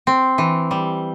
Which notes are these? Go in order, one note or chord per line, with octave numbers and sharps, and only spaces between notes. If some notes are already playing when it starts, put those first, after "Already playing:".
C4
E3
G3